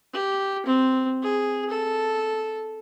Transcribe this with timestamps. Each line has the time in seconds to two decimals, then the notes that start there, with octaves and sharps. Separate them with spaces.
0.13 G4
0.66 C4
1.22 G#4
1.70 A4